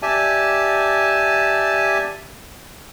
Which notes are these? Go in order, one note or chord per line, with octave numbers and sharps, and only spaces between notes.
G4 D5 E5 G#5 A5